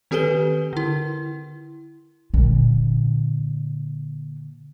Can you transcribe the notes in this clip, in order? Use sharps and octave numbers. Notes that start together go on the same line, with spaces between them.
D#3 C4 G4 A4 B4 G7
D3 E4
A#2 D3